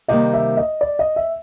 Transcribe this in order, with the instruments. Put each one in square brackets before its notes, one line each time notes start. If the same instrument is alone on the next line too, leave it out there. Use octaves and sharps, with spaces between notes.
[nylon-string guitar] C3 D#3 G3 A#3 [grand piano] D#5
[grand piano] E5
D#5
D5
D#5
E5